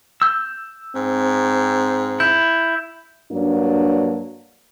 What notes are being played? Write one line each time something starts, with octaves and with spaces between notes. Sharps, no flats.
E6 G6
G#2 C4
E4 G6
G2 F#3 A#3 D4